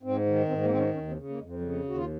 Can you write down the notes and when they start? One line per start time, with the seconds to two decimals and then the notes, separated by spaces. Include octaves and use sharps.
0.03 G#2 C4
0.26 D#3
0.48 G#2 C4
0.63 A#3
0.70 D#3 C4
0.78 C#4
0.94 D#2 C#4
1.09 C4
1.16 C#3
1.29 A#3
1.38 F2 G#3
1.50 F3
1.61 C#3 F#3
1.72 G#3
1.83 D#2 F#4
1.96 F4